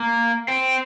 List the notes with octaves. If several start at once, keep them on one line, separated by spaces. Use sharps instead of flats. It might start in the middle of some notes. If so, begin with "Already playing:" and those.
Already playing: A#3
C4